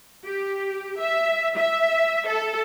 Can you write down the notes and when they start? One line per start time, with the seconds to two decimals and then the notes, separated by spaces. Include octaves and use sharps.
0.24 G4
0.99 E5
1.56 E5
2.27 A4